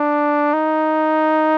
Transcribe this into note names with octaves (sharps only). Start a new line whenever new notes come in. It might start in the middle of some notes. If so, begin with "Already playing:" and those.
Already playing: D4
D#4